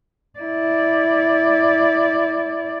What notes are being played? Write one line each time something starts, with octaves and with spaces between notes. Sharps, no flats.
E4 D5